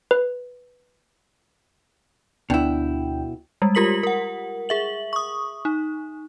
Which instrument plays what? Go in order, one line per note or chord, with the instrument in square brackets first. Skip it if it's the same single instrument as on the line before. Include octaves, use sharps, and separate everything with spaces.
[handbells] B4
[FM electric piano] D2 D4 G5 [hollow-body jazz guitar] B2 E4
[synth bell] G3 G#3
F4 G4 A#4 B6 F#7
A#4 F#5
G#4 E5 F#7
C#6 D#6
D#4